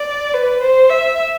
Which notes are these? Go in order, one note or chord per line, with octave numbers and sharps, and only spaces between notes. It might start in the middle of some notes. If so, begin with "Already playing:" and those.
Already playing: D5
B4
C5
E5